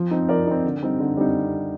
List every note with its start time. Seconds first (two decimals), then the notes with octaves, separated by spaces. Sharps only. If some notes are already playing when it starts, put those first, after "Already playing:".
Already playing: F3
0.11 C4 D#4
0.29 F3 A#4 D5
0.47 C4 D#4
0.64 D3
0.82 G3 C4 D#4
1.00 D3
1.17 G3 C4 D#4